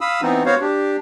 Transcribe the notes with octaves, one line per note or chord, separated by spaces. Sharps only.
F5 B5 D#6 E6
E3 B3 C4 D#4
B3 F#4 C5 C#5 F5
D4 G4